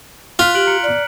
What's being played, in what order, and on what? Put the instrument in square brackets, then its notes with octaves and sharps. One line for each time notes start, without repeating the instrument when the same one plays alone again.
[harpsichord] F4 [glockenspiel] F6 F#6 B6
[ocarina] G4 [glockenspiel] F#6 D7 F#7
[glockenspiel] A#5 C#7
[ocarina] D5